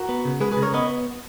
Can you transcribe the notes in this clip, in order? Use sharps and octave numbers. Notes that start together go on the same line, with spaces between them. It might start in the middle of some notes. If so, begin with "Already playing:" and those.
Already playing: F#4 A#4
B3
C#3
G#3 G#4 B4
C#3 G#4 B4
A#4 C#5
B3 B4 D#5